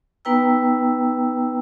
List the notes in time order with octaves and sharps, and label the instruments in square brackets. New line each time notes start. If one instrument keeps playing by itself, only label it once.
[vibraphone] B3 D#4 B4 G5 A#5 E6